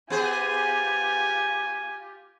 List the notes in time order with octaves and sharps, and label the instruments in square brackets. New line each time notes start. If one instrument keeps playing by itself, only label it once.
[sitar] B3 G#4 C5 [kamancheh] F4 G4 [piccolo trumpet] G#5